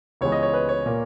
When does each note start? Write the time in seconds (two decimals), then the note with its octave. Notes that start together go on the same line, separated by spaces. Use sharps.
0.21 C#2 C#3 E3 G#3 B3 C#5
0.32 D#5
0.43 C#5
0.54 B4
0.69 C#5
0.86 A#2 A#3